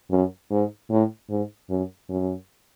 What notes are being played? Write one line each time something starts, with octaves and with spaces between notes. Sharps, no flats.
F#2
G#2
A2
G#2
F#2
F#2